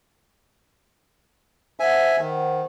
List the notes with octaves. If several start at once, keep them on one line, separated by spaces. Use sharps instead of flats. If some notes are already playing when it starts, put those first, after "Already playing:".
C5 E5 F#5 G#5
D#3